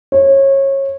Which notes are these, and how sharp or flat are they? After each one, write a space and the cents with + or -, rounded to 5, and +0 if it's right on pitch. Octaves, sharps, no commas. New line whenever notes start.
C#5 -25